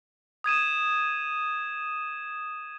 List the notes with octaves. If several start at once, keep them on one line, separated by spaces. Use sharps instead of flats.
D#6 G#6 D#7 E7